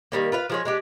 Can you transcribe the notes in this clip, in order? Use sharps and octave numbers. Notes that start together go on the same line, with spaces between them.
D#3 G3 A#3
F4 B4 F5
F3 G#3 C#5
G#3 D4 G4